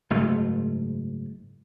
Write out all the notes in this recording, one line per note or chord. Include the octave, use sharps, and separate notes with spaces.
F#1 G#2 A3